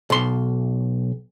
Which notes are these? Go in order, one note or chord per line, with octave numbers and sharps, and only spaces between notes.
B1 C6